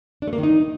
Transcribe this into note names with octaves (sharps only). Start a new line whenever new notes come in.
D4
A3
A#3
D#3
D#4